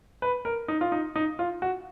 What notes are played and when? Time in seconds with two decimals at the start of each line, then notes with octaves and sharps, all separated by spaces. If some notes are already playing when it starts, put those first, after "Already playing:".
0.22 B4
0.45 A#4
0.68 D#4
0.81 F4
0.92 D#4
1.16 D#4
1.39 F4
1.62 F#4